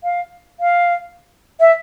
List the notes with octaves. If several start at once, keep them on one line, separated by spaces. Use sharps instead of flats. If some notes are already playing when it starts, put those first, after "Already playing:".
F5
F5
E5